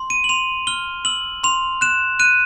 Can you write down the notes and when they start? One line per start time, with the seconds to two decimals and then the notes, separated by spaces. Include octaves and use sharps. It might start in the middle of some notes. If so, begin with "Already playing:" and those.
Already playing: C6
0.10 D#7
0.24 F#7
0.29 C6 F7
0.67 F6 G7
1.05 E6 F#7
1.44 C6 F7
1.81 F#6 E7
2.19 F#6 D#7